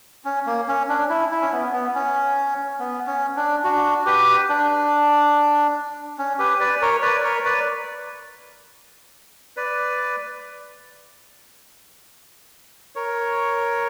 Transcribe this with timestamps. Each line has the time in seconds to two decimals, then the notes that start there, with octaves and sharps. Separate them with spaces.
0.25 C#4
0.46 A#3
0.68 C#4
0.89 D4
1.10 E4
1.31 E4
1.41 C#4
1.52 B3
1.73 B3
1.95 C#4
2.80 B3
3.07 C#4
3.36 D4
3.64 D4 F#4
4.05 G4 B4
4.49 D4
6.18 C#4
6.39 G4 B4
6.60 B4 D5
6.82 A#4 C#5
7.02 B4 D5
7.23 A#4 C#5
7.45 B4 D5
9.57 B4 D5
12.95 A#4 C#5